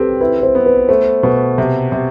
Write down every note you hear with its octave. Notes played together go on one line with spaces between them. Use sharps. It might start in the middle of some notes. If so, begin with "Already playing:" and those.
Already playing: C4 G4 A4 B4
E4 B4
C5
B3
B4
A3 C5
B2 B4
C3
C3